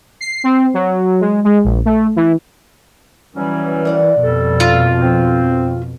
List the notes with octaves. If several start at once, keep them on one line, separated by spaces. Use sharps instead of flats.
C7
C4
F#3
G#3
G#3
A#1
A3
E3
E3 F#3 G3 C#4
A#4 D5 F#5
F2 B2 G3 A4
F4
C4